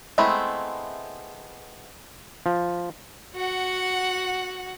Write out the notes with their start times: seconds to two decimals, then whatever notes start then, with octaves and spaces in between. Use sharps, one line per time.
0.18 G#3 A3 B3 C4 E4
2.46 F3
3.36 F#4 F#5